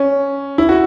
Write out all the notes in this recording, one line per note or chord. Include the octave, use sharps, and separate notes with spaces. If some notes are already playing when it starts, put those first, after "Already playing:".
Already playing: C#4
E4
F#4